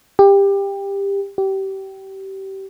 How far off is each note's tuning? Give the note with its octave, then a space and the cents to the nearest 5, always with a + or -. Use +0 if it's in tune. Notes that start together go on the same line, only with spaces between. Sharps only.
G4 +20
G4 -25